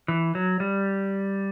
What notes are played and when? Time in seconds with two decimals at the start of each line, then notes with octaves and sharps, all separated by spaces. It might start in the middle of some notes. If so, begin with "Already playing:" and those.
0.08 E3
0.35 F#3
0.60 G3